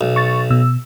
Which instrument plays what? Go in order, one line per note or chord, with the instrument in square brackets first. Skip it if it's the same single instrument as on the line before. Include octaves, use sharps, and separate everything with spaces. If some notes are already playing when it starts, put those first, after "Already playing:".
[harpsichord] B1
[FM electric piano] C#6 A6
B2 E6